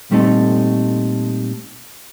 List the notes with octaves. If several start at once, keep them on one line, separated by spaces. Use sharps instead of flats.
A#2 G3 A3 C4 D#4 A4